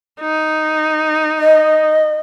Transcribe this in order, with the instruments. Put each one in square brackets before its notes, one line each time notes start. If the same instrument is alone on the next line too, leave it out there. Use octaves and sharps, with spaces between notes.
[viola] D#4
[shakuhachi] D#5